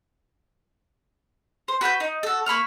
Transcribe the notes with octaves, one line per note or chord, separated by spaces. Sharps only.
C5
F#4 B4 F6 G6
D#4
F#4 A4
A#3 B5 C#6 F6